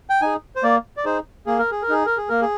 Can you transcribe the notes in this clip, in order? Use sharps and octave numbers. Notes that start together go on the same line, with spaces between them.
G5
D#4 G#4 G#5
C5
A#3 D5
D5
D#4 G#4 C5
A#3 G#4
A#4
G#4
A#4
D#4 G#4
A#4
G#4
A#3 A#4
G#4